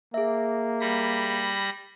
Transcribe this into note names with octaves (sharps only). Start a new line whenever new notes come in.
A#3 G#4 E5
G3 B5 A#6